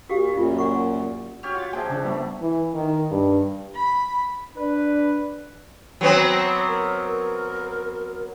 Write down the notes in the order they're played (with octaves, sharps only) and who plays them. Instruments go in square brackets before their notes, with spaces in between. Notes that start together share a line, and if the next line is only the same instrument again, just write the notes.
[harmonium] A#2 [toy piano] F#4 G4 F5
[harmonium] F#2 A#2 [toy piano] D#4 F4
[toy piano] D5 F#5 C#6
[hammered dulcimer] F#4 G4 C#5 [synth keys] F6
[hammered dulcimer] F4 [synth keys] F#5 A6
[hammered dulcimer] A#2 F3 E5 [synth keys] G#4 G5
[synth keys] C#3 [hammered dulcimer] D4
[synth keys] G3 B3 [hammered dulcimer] A3
[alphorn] E3
D#3
G2
[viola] B5
[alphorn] D4 [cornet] B4
[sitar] F#3 B3 C4
[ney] A#4